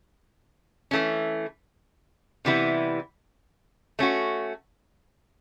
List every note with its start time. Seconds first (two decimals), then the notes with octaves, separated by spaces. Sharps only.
0.91 E3 A3 C#4
2.45 C3 E3 G3 B3 E4
3.99 A3 C#4 F#4